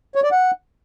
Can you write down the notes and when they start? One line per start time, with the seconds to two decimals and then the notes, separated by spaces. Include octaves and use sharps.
0.15 C#5
0.24 D5
0.32 F#5